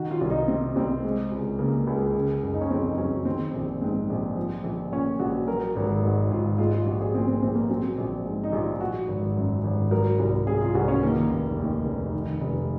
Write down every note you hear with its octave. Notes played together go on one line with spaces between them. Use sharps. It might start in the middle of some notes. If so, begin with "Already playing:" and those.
Already playing: D#3 F#4
F4
C2
D#4
C3 C4
C2 C4
G#3
C#2
C#3 A#3
C#2
C#3
F#1
D#4
C#4
F2 C4
D#4
F#3 C#4
D#3 C4
A#1
G#2 C4
A#1
F3
A#1
A#2 C#4
A#1 F#4
F#3 A#4
G#1 A#4
G#2 F#4
G#1 F4
G#3 F4
F4
A#1 F#4
G#4
A#2 C4
C4
A#1 C4
A#3
F#3 C4
A#1
G#2
D#4
A#1 F4
F3 F#4
G#1
F#2
G#1
F#3 A#4
C2
C3 G#4
F4
C2 F#4
C#4
D#3 A#3
F1
D#2
F1
D#3
F1